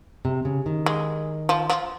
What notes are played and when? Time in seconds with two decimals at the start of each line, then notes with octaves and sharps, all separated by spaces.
0.25 C3
0.45 C#3
0.66 D#3
0.86 G#3
1.49 F3
1.70 F3